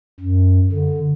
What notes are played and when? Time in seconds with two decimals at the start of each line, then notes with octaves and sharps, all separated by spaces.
0.20 F#2
0.72 D3